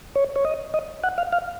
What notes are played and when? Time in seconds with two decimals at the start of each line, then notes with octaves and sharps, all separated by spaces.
0.15 C#5
0.36 C#5
0.45 D#5
0.74 D#5
1.04 F#5
1.18 F5
1.32 F5